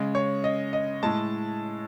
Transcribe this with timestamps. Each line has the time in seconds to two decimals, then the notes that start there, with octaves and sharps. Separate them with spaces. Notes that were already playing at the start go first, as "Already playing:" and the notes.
Already playing: C#3 G#3
0.15 C#5
0.44 D#5
0.73 D#5
1.03 A2 G#3 A5